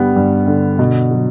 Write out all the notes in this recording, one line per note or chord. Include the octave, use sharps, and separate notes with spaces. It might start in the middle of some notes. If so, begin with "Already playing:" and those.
Already playing: G2 D3 G3 B3
G2
D3
B2
F#3